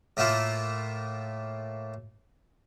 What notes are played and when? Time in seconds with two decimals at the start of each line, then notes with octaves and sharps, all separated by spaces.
0.17 A2 A3 A#3 E4 F4